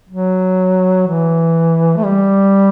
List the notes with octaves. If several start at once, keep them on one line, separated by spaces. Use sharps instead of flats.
F#3
E3
A3
G3